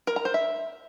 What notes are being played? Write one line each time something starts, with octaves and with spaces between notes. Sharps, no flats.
A#4
A#5
C5
E5